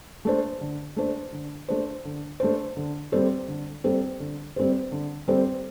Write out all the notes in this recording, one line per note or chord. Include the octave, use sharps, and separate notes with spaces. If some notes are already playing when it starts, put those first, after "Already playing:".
A3 D4 C5
D3
A3 D4 C5
D3
A3 D4 C5
D3
A3 D4 C5
D3
G3 C4 A4 C5
D3
G3 C4 A4 C5
D3
G3 C4 A4 C5
D3
G3 C4 A4 C5